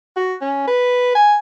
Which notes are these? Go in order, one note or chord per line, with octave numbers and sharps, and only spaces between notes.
F#4
C#4
B4
G#5